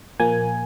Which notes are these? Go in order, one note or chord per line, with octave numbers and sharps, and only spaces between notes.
A#2 F3 A#3 G#5